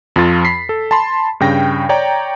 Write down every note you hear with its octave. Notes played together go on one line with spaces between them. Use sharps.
F2 F3 F4 A6
B5 B6 C7
A4
A5 B5 C6
G2 C#3 G5 A#6
C#5 D5 G5 A#5